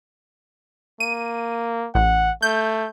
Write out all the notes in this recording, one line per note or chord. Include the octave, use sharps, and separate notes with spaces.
A#3 D#7
A1 F#5
A3 G6